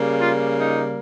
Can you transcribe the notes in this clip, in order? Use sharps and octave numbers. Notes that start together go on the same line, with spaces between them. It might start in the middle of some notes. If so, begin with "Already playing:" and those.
Already playing: C#3 G3 A#3
F4
D#4